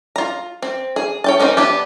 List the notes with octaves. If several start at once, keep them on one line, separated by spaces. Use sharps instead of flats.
F4 A#5
C4
G#4
C#5 G5 A5
C4 C#4 D#4 A#4
B3 D4 G4